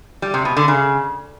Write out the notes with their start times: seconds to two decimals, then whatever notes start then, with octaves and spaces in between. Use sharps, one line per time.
0.22 G3
0.34 C3
0.45 B2
0.57 D3
0.68 C#3